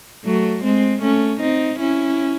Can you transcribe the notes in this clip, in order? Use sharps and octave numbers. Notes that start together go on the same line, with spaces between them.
F#3 A3
G#3 C4
A3 C#4
C4 D#4
C#4 E4